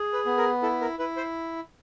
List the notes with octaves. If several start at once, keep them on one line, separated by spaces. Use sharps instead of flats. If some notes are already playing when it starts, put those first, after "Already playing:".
Already playing: G#4
B4
B3
A#4
E4 A4
A#4
E4 B4
C5